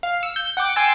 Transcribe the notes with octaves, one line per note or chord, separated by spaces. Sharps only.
F5
E6 C#7
G6
F#5 G5 D6
G5 G#5 C6 E6 A6